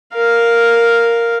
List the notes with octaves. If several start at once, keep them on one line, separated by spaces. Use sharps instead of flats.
A#4 F5